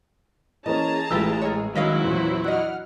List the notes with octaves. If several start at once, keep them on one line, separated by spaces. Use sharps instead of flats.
E3 A#3 C#4 G#4 D#5 A5 A#5
A1 A2 G#3 F4 G4 B4 E6
G#4 A#4 C#5
D#3 F#3 G#3 C#4 E4 F#4 D#5 F5
E2 A#2 B3 C5
D4 D#5 F#5 F6